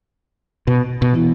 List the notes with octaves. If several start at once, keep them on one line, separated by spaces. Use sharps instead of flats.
B2
B2
E3 B3 E4